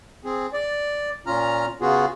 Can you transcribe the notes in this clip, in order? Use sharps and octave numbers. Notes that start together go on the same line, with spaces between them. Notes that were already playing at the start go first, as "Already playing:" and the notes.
C4 G#4
D5
A#2 C#4 F4 A#5 F6
C#3 B3 F4 F#4 G#4